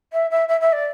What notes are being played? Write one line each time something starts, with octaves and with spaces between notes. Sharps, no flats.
E5
E5
E5
E5
D5